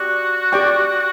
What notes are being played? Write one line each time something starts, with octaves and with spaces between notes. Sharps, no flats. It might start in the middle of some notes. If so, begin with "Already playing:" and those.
Already playing: F#4 G4 D5
G4 D5 G5 C#6